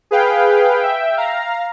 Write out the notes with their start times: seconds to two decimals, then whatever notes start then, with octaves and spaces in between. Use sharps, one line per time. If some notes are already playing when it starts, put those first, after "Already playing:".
0.11 G#4 B4 F5 G5
0.80 E5 G5
1.17 F5 A#5